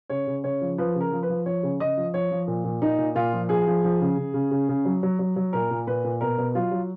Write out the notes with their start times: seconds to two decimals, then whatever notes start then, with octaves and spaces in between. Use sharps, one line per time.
0.10 C#3 C#5
0.27 C#3
0.44 C#3 C#5
0.61 F3
0.78 F3 B4
0.95 C#3
1.01 A#4
1.12 F3
1.23 B4
1.29 F3
1.46 F3 C#5
1.63 C#3
1.80 C#3 D#5
1.97 F3
2.14 F3 C#5
2.31 F3
2.47 A#2
2.64 A#2
2.81 A#2 D#4
2.98 A#2
3.15 A#2 F4
3.33 F3
3.49 F3 G#4
3.67 F3
3.84 F3
4.01 C#3
4.18 C#3
4.34 C#3
4.51 C#3
4.69 C#3
4.85 F#3
5.03 F#3
5.19 F#3
5.36 F#3
5.53 A#2 A#4
5.71 A#2
5.87 A#2 B4
6.04 A#2
6.21 B2 A#4
6.38 B2
6.55 F#3 F4
6.71 F#3